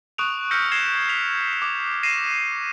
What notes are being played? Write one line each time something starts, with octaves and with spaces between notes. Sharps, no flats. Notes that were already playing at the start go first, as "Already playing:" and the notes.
C#6 D#6 F#6 D7 F7
E6 F6 G6 A#6 B6 C#7
G#6 A#6 C7 E7 G7
B6 F7
D6
A#6 C7 D#7 E7